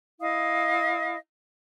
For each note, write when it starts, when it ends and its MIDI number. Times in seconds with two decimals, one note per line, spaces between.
0.19 1.16 64
0.19 1.16 75
0.19 1.16 77
0.19 1.16 87